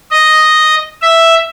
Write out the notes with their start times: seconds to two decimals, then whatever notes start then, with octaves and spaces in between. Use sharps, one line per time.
0.11 D#5
1.02 E5